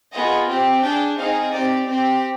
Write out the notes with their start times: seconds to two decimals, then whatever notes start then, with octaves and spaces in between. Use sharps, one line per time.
0.13 B3 F4 G#4 D#5
0.48 C4 G4
0.83 D4 G#4 G5
1.18 C4 D#4 G#4 F5
1.53 C4 G4 D5
1.87 C4 G4